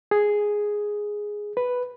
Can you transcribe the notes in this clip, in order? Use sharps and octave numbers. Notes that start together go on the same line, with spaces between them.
G#4
B4